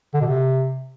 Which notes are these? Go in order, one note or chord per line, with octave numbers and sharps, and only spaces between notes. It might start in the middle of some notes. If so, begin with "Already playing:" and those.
D3
B2
C3